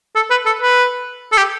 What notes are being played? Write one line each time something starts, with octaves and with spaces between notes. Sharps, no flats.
A4
B4
A4
B4
A4
G4